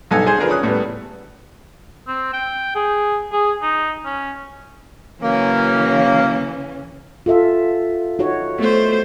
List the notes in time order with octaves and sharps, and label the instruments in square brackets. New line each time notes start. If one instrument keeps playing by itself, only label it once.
[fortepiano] B1 G2 D#4 A4 F#5 G#5
G#4 C5 G#5
D3 F3 D4 G#4 A#4 B4
C#4 D#6 F#6
A2 G3 B3
[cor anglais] C4
G5
G#4
G#4
D#4
C#4
[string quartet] C#3 E3 C#4 [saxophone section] F#3 A#3
[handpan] F4 A4 E5
D#4 F#4 C#5
[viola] A3 C5 [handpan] B3